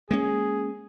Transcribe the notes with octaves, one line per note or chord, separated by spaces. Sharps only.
G#3 A#3 C#4 G#4